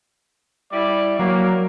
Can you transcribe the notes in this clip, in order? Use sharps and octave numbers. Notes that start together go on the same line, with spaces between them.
G3 E4 D5
F#3 A#3